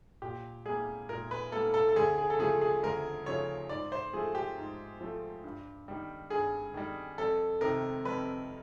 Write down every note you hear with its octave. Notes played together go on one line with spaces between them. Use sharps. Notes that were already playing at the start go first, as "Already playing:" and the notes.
A#2 G4
G3 A#3 G#4
A#2 A#4
B4
G3 A#3 A4
A4
A4
D2 G#4
G#4
A4
C#3 F3 A3 G#4
G#4
D2 A#4
C#3 F3 A3 C#5
G#2 D5
C5
F3 A3 G#4
G4
G#2
F3 A3
G2
D#3 G3
G2 G#4
D#3 G3
F2 A4
C3 D#3 A#4
F2 B4